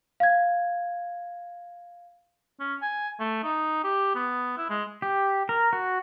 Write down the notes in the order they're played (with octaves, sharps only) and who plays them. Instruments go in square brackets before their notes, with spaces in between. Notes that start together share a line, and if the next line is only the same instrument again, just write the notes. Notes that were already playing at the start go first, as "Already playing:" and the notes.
[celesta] F5 G#6
[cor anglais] C#4
G#5
A3
D#4
G4
B3
E4
G#3
[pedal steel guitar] G4
A#4
F#4